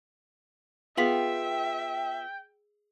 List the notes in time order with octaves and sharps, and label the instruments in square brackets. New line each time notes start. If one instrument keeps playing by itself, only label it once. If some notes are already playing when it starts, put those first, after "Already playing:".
[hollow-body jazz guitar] B3 F4 [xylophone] G#4 B6 F#7 [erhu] E5 [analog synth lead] G5